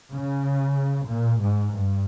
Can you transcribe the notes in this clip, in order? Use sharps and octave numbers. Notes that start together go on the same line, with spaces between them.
C#3
A#2
G#2
G2